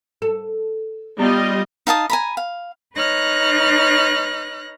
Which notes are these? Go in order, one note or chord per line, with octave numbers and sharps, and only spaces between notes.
A4
G3 B3 F4 D#5
D#4 F5 A5 D#6
G#5 A#5 B5
F5
D#4 B4 C#5 F6 F#6 A#6